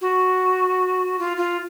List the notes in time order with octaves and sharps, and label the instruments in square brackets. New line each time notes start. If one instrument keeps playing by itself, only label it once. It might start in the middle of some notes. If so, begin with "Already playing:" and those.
[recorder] F#4
F4
F4